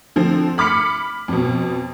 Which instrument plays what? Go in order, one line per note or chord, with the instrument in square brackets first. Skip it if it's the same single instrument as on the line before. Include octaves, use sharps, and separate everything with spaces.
[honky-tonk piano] D3 F3 C4
B5 D6 F6 B6 C#7
F2 B2